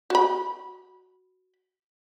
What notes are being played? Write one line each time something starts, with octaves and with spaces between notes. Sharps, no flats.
F#4 B5